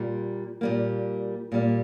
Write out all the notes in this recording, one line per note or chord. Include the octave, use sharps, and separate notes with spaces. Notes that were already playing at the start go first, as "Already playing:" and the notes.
Already playing: A#2 G3
A#2 G3 A#3
A#2 G3 A#3